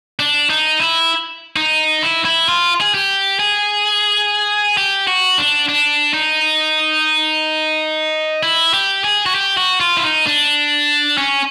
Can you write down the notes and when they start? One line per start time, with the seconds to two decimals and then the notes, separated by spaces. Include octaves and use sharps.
0.19 D4
0.50 D#4
0.80 E4
1.56 D#4
2.03 E4
2.25 E4
2.49 F4
2.81 G#4
2.94 G4
3.39 G#4
4.77 G4
5.07 F#4
5.38 D4
5.69 D4
6.14 D#4
8.43 E4
8.74 G4
9.04 G#4
9.26 F#4
9.35 G4
9.57 F#4
9.80 F4
9.97 E4
10.04 D#4
10.27 D4
11.18 C#4